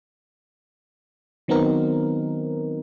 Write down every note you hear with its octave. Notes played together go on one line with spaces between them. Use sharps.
D#3 F#3 B3 C4 D#4 A#4